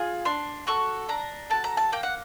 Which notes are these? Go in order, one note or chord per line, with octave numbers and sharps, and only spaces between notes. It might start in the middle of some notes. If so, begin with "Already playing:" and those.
Already playing: F4 G#4
D4 C6
F#4 A4 C#6
D4 A#5
F#4 A4 A5
A#5
A5
A#3 G5
F#5